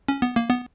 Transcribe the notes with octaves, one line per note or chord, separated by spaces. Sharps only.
C#4
B3
A#3
B3